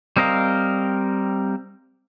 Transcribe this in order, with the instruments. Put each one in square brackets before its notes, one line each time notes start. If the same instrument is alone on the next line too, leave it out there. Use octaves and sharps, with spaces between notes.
[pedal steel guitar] G3 C4 A#4 D#5 F5